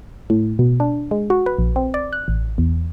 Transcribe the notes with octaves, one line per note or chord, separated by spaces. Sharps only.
A2
B2
D4
G#3
F#4
B4
A#1
C4
D5
F#6
A1
E2